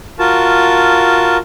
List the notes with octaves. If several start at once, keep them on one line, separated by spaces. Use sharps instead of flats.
F4 F#4 A#4 A5